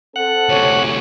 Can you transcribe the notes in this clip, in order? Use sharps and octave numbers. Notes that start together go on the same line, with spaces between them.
C4 A4 F#5
D2 C3 C#5